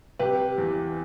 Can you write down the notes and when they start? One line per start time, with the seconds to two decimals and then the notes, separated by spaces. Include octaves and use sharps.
0.19 C3 G4 B4
0.58 E2